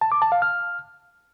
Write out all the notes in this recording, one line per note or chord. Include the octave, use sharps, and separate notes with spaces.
A5
D6
A5
F5
F6